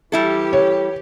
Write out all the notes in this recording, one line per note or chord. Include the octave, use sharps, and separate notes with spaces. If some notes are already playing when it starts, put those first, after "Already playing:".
E3 G3 E4 G4 A4
C#5